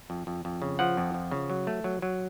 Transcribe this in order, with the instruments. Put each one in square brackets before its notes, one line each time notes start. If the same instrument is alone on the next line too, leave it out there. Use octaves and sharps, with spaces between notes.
[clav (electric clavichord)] F2
F2
F2
C#3
F3 F#5
F2
F3
C#3
F#3
A3
F#3
F#3